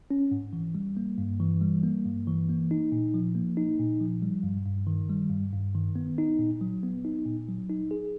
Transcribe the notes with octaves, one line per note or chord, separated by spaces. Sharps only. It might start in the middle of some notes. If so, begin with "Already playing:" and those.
C#4
G#2
E3
G3
A#3
G2
E3
G3
A#3
G2
E3
A#3
D#4
A#2
F3
A#3
D#4
A#2
F3
G3
G2
G2
D#3
G3
G2
G2
D#3
B3
D#4
A#2
F#3
B3
D#4
A#2
F#3
D#4
G#4